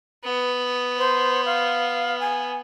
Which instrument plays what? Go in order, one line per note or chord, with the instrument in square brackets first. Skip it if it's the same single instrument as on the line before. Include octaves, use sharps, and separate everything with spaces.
[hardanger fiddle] B3
[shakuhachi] C5
F5
G#5